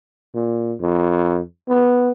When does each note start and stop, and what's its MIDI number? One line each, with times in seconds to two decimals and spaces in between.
0.35 0.73 46
0.81 1.39 41
1.69 2.11 59